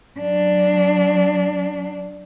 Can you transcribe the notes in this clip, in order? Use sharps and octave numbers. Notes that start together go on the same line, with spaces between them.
F#3 D4